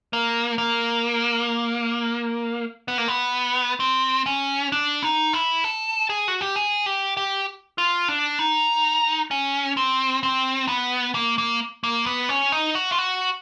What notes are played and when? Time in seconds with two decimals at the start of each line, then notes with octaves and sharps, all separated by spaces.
0.13 A#3
0.58 A#3
2.88 B3
2.98 A#3
3.08 B3
3.80 C4
4.26 C#4
4.72 D4
5.03 D#4
5.33 E4
5.64 A4
6.10 G#4
6.28 F#4
6.41 G4
6.56 G#4
6.86 G4
7.17 G4
7.78 F4
8.08 D4
8.39 D#4
9.31 C#4
9.77 C4
10.23 C4
10.68 B3
11.15 A#3
11.38 A#3
11.84 A#3
12.06 B3
12.29 C#4
12.52 D#4
12.75 F#4
12.92 F4
12.99 F#4